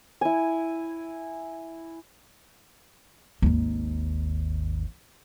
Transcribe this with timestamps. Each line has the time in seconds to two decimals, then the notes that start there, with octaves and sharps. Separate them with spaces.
0.21 E4 G#5
3.42 G#1 D#2